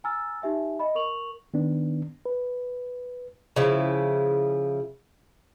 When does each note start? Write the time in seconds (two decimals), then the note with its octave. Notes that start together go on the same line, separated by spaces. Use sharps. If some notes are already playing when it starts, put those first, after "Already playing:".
0.04 G#5 A#5 E6 F6 A6
0.42 D#4 G4 E5 G#5
0.79 D#5 B5
0.95 A#4 C#6 F7 F#7
1.54 D#3 B3 D4
2.26 B4
3.56 C#3 F3 E4